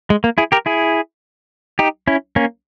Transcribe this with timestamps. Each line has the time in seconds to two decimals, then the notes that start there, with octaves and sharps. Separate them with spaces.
0.10 G#3
0.24 A#3
0.38 E4 G#4
0.52 G4 A#4
0.66 E4 G#4
1.79 D#4 G4
2.08 C#4 E4
2.36 A#3 C#4